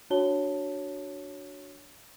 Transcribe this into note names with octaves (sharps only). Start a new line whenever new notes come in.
D4 F#4 C#5 A5 G7